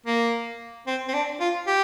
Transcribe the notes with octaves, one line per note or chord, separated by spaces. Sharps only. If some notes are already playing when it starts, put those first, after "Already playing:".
A#3
C4
C4
D4
F4
G4